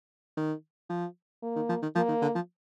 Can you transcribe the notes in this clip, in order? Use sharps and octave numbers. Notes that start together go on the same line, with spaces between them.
D#3
F3
A#3
D#3
F3
D#3
F3 A#3
D#3
D3
F3